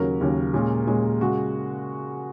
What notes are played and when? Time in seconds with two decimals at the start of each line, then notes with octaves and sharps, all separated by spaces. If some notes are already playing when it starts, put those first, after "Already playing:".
Already playing: D#2 C#3 F#3 C#4 A#4
0.21 D#2 C#3 F#3 C#4
0.54 A#2 G#3 C#4
0.87 A#2 G#3 C#4
1.21 C#3 G#3 F#4